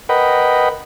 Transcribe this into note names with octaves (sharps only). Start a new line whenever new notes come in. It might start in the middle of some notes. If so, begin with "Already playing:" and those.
A#4 B4 D#5 F#5 G5 B5